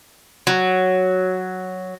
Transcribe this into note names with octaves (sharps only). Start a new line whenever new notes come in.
F#3